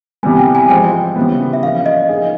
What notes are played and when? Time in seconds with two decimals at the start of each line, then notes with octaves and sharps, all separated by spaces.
0.23 C3 E3 G3 B3 G#5
0.39 G5
0.55 G#5
0.69 F3 G#3 C4 G5
1.16 C#3 E3 G3 B3
1.53 E5
1.63 F3 A#3 C#4 F5
1.86 D#5
2.09 F3 A#3 D#4 G#4